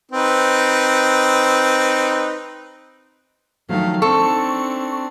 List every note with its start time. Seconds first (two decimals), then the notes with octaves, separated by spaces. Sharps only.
0.11 C4 D#4 B4
3.69 D#3 F3 F#3 A3 F5
4.02 C4 D4 D#4 A4 C#6